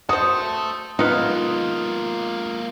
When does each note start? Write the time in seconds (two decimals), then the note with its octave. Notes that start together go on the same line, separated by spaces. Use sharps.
0.09 A3 F#4 A4 C5 D#6
0.99 G#3 A#3 B3 D#4 F4